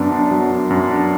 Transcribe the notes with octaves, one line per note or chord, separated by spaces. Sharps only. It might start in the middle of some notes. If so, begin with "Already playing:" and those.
Already playing: F#2 B3 D4
D4
F#3
D4
F#2
D4